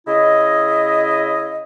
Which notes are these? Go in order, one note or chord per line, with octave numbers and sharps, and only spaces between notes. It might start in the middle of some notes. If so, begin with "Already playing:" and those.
C#3 E4 D#5